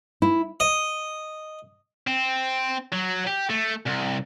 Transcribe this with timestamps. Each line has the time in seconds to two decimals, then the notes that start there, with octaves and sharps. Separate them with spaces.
0.22 E4
0.60 D#5
2.07 C4
2.93 F#3
3.27 G4
3.50 A3
3.87 C2